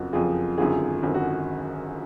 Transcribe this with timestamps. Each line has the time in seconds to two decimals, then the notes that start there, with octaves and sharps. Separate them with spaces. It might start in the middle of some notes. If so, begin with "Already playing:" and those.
Already playing: F#1 F2 F3 F#4
0.13 F#1 F2 F3 F4 G#4
0.58 G#1 F#2 D3 F4 G#4
1.03 G#1 F#2 D3
1.14 F#4